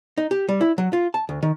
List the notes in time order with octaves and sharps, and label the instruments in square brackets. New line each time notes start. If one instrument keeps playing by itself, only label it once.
[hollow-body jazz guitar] D#4
G4
G3
E4
F#3
F4
A5
D2
D#3